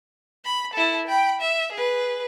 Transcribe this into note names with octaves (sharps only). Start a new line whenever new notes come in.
B5
E4 A4
G5 B5
E5
G#4 B4